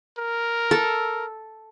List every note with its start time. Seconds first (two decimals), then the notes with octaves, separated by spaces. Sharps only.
0.18 A#4
0.71 A4